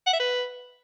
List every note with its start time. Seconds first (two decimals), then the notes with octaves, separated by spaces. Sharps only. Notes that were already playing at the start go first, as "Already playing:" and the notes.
0.07 F#5
0.13 E5
0.20 B4